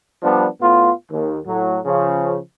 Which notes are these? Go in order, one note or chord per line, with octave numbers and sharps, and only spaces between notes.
F3 G3 B3 D4
A2 B3 F4
D#2
A2 F#3
C#3 F3